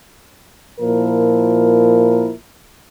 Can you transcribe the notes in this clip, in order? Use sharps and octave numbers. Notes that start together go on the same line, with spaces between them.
A#2 F3 E4 A#4